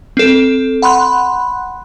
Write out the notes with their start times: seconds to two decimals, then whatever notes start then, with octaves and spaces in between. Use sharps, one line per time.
0.17 C4 A4
0.82 F#5 B5 C6 F#6